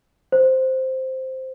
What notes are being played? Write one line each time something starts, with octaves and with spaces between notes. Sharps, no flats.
C5